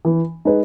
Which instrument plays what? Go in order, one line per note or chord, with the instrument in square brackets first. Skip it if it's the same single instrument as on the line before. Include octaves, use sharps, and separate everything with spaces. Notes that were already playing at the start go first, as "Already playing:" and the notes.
[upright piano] E3
G#3 D#4 G#4 B4